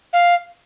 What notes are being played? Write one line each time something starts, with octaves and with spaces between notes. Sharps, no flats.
F5